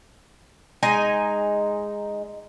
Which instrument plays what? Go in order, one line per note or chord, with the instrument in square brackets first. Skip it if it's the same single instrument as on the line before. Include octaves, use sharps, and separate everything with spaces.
[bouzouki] G#3 D#4 G#5